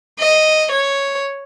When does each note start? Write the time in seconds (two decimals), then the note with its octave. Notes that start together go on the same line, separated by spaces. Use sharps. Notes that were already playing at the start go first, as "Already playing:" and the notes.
0.20 D#5
0.72 C#5